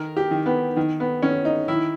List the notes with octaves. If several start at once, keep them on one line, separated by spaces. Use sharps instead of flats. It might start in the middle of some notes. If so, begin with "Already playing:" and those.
Already playing: D#3 A#4
G4
D#3
B3
D#3
B3
D#3 C#4
D#4
D#3 E4